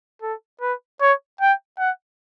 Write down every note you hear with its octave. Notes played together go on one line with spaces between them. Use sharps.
A4
B4
C#5
G5
F#5